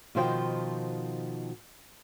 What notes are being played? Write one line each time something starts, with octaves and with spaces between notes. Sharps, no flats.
B2 D#3 F3 C5 E5 G5